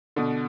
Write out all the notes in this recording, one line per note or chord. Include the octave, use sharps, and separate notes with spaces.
B2 D3